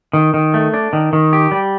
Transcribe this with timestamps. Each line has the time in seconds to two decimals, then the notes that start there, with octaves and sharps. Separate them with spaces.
0.13 D#3
0.34 D#3
0.54 A3
0.74 D4
0.93 D#3
1.13 D#3
1.33 G4
1.52 G3